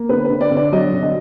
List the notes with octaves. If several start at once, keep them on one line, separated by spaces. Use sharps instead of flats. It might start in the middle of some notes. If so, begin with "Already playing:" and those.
Already playing: A#3
D3 B4
B4
D3
D5
D3
D5
F#3 D#5
D3
D#5